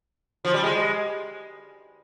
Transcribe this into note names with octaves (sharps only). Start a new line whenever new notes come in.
F3
G3
G#3